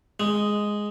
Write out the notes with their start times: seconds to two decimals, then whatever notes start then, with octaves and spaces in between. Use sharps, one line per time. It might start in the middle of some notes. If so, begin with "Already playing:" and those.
0.20 G#3